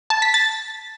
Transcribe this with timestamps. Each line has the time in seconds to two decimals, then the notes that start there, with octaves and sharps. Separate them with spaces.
0.10 A5
0.22 B6
0.34 A6